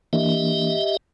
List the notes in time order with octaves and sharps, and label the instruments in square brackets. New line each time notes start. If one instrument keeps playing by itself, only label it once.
[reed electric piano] E3 A#3 D4 [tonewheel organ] G4 D#5 E5